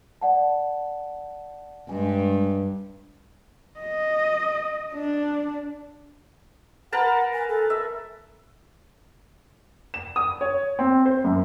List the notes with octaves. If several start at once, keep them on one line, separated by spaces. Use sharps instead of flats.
D5 F#5 A5
G2 G#3 G#5
D#5
D4
A#4 B4 F#5 A5
G#5
A4
E5
E7
D#6
C#5
C4
C5
F#2